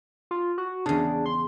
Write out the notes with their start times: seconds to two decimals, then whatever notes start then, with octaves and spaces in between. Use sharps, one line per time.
0.31 F4
0.58 F#4
0.86 E2 C#3 D4
1.26 C6